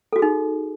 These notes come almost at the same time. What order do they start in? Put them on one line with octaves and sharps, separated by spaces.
A4 F#4 G#4 D#4